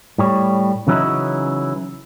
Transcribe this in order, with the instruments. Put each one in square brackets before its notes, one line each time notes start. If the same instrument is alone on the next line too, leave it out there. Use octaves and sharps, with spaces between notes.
[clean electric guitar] A2 G3 C#5
C#3 E3 F#3 C#4 D#4 E4